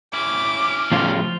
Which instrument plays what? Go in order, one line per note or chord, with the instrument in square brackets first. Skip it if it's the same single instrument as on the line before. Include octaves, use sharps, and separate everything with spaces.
[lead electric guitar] C#4 E4 [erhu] D6
[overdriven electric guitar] A2 C#3 [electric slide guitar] F3 F4